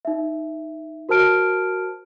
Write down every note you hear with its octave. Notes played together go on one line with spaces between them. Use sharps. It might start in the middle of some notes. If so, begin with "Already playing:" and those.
D#4 E5
F#4 A#4 C5 A5 F6 D7